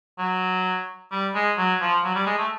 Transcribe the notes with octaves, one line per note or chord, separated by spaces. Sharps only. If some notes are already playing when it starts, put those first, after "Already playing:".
F#3
G3
G#3
F#3
F3
F#3
G3
G#3
A3